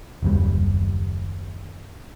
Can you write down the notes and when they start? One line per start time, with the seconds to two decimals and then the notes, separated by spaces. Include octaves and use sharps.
0.23 F#1 D#2 G3